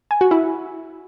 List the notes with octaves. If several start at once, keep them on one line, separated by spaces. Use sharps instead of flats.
G#5
F#4
E4